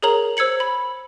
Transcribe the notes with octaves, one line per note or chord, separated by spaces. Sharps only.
G#4 A#4 C#5 A#5 F#7
C5 E6 G#6 C#7 F#7
B5